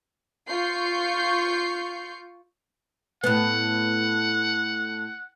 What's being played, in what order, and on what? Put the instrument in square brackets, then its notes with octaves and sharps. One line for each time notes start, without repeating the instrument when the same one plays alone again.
[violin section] F4 C#6 G6 C7
[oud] A2 B3 [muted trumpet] F#5